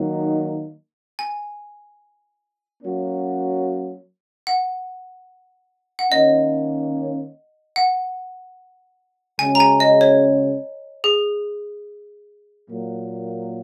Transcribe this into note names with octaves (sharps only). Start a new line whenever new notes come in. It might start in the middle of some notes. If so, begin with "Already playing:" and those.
Already playing: D#3 F#3 A#3 D#4
G#5
F#3 A#3 C#4 F#4
F#5
F#5
D#3 A#3 C#4 D#5
F#5
C#3 G#3 C#4 F#4 G#5
A#5
G#5
D#5
C#5
G#4
A#2 F#3 A#3